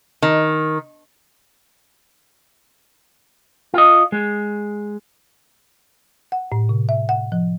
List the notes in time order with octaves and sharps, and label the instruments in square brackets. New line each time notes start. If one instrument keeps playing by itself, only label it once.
[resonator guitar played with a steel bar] D#3
[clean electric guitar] F4 D#5
G#3
[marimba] F#5
A2
C3
E5
F#5
F3